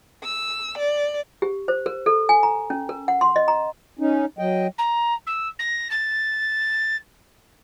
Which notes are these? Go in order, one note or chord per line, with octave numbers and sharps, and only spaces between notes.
E6
D5
G4
C5
A#4
A4
G#5
A#5
C#4
A#4
F#5
C6
D#5
A#5
C#4 D#4
F#3 D#5 G5
A#5
E6
A#6
A6